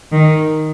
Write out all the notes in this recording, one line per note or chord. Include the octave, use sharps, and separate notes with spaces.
D#3